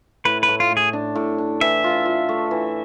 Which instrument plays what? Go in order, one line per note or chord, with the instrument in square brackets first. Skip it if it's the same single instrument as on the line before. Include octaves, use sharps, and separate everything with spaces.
[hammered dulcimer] A2 [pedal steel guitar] B4
[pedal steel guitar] B4
[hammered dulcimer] A2
[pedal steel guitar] F4
[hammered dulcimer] A2
[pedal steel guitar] G#4
[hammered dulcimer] D4
A2
D4
[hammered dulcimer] E3 [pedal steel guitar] E5
[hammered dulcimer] F4
F4
A3
E3